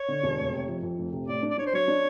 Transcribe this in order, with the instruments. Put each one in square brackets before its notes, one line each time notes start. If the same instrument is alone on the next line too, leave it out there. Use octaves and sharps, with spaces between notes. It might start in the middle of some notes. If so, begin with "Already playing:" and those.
Already playing: [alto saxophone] C#5
[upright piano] D3
E1
F1
C3
F2
F2
F1
C3
[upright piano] A2 [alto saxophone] D5
[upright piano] D4
[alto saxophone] D5
[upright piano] D4 [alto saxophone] C#5
[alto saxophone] C5
[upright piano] F#3 [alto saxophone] C#5
[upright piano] D4